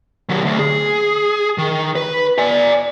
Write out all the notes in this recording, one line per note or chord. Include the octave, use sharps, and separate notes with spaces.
D#3 F#3
D2
G#4
D#3
B4
D5 G#5